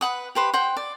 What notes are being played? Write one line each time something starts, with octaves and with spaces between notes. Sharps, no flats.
B4 F#5 D#6
G4 B4 C5
C5 F#5 G5
D5